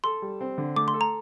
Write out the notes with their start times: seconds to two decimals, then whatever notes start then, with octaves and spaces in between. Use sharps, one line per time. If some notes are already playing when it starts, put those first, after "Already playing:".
0.04 A4 C6
0.22 G3
0.41 C4
0.58 D3
0.76 A3 D6
0.88 C6
0.94 A4
1.01 A#5